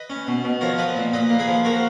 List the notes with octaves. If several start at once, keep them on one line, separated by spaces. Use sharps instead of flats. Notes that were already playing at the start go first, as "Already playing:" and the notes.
Already playing: B4 D#5
C#4
B2
B2
F3 A#4 C#5
F3 B4 D#5
A#2
A#2 B4 D#5
A#3
G#4 B4
F3
A#3 F#4 A#4